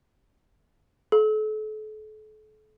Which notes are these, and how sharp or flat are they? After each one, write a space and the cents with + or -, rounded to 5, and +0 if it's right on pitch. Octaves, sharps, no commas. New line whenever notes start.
A4 -40